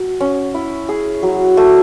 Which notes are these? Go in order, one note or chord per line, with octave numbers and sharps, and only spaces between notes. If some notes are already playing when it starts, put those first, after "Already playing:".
Already playing: F#4
C#4
E4
G#4
F#3
A3